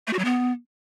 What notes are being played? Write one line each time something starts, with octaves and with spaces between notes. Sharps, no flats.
A3
F#4
F#3
B3